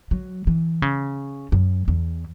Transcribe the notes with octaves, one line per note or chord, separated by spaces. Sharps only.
F#3
E3
C#3
F#2
E2